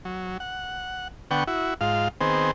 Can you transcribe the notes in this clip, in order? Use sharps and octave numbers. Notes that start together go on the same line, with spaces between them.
F#3
F#5
D3 B3 F#5 G5 C#6
E4 F#4
G#2 F4 F5
D#3 B3 C4 G#4 C5